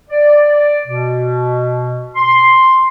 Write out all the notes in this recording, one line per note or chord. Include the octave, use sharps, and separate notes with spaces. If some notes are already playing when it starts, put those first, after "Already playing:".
D5
B2
C6